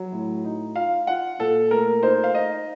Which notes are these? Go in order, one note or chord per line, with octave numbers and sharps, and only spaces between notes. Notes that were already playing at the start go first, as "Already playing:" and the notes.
Already playing: F#3
A2
D#4
F4 F5
F4 F#5
A#2 A4
A3 A#4
D#4 C5
F5
D#4 D#5